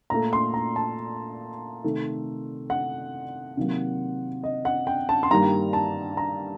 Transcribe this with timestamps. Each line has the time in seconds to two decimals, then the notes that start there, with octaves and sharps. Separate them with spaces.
0.10 A#2 A3 A#5
0.33 C6
0.54 A#5
0.76 A5
1.84 C3 D#3 A3
2.70 F#5
3.57 C3 D#3 F#3 A#3
4.43 D#5
4.65 F#5
4.87 G5
5.09 A5
5.23 C6
5.31 G2 D#3 G3 A#3 A#5
5.73 A5
6.17 A#5